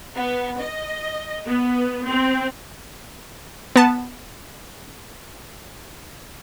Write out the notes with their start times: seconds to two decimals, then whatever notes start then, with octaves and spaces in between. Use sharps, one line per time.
0.16 B3
0.61 D#5
1.46 B3
2.07 C4
3.76 B3 A5